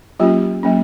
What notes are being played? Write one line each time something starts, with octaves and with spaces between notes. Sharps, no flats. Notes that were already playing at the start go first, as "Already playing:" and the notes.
F#3 A#3 C#4 F4 G4
F#3 A#3 C#4